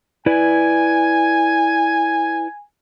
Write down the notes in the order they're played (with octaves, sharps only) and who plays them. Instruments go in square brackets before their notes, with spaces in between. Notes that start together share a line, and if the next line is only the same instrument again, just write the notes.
[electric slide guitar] E4 B4 D5 [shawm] G#5